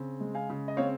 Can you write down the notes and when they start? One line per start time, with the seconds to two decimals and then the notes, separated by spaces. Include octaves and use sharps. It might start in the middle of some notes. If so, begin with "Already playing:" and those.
Already playing: C#3 C4
0.20 G#3
0.35 F5 G#5
0.50 C#3
0.68 D#5
0.77 C4 C#5 F5